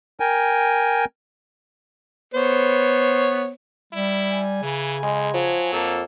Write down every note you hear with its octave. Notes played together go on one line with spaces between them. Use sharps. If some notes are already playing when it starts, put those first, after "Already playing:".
A#4 G5 G#5
B3 C5 C#5
G3 E4
G#5
C#3 E3
F2 G#3
F3 F#3
F2 A#3 A4